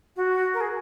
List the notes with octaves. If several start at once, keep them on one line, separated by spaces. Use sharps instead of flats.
F#4
A#4
G#4